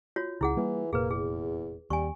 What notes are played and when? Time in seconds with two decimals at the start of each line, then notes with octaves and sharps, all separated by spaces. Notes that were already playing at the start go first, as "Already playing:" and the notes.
0.16 F4 F#4 C#5
0.41 C#2 C#3 E4 G#4 F#5
0.57 E3 G3 A#3
0.93 F1 A#2 A#3 G#4 B4
1.10 E2 G#4
1.90 D#2 G3 G#5 C#6